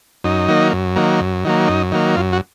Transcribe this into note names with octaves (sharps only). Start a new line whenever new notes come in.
F#2 D#4
D#3 F#3 A#3
F#2
D#3 F#3 A#3
F#2
D#3 F#3 A#3
F#2 D#4
D#3 F#3 A#3
F#2 F4
F#4